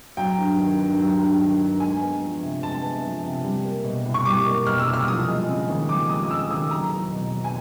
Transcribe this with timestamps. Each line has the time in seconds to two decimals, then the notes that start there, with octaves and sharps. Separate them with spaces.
0.17 F#3 G5
0.38 G2
0.59 D#3
0.79 G2
0.99 F#3
1.19 G2
1.40 D#3
1.60 G2
1.80 G#3 G#5
2.01 B3
2.21 F3
2.43 C3
2.62 G#3 A5
2.82 B3
3.04 F3
3.24 C3
3.44 G3
3.65 A#3
3.84 B2
4.06 C2
4.14 C#6
4.25 G3 D6
4.46 A#3
4.66 B2 F6
4.79 E6
4.87 C2
4.94 F6
5.08 F3 D#6
5.28 G#3
5.48 C#3
5.69 D#2
5.89 F3 D6
6.09 G#3 D#6
6.23 D#6
6.30 C#3 E6
6.50 D#2 D#6
6.71 F#3 A#5
6.92 E2
7.12 B2
7.32 E2
7.44 G#5